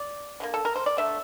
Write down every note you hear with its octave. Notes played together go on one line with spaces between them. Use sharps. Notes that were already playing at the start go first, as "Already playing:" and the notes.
Already playing: D5
D3 G3 A#3
A4
A#4
C5
D5
D3 A3 E5